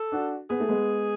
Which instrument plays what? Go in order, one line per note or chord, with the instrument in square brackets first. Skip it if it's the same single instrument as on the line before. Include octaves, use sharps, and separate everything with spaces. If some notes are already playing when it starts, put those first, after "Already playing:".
Already playing: [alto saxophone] A4
[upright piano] D4 F#4
[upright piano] B3 [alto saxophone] G#4
[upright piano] A3
G#3 B3